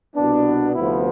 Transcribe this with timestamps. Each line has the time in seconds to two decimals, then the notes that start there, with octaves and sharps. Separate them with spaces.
0.15 C2 B2 B3 D4
0.75 D2 C3 F3 B3 E4